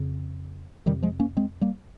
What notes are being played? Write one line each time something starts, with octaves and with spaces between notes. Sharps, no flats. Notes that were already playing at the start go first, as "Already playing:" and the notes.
Already playing: F2 C#3
F2 C3 D#3 G3
F3 G#3
A#3 C#4
G#3 C4
G3 A#3